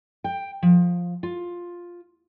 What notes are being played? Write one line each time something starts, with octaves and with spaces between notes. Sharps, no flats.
G5
F3
F4